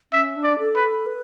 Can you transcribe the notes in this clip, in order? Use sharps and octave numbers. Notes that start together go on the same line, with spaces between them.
C#4 E5
D4
D5
A4
B4
A4
B4